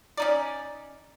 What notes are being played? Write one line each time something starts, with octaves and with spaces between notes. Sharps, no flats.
C#4 D#4 D5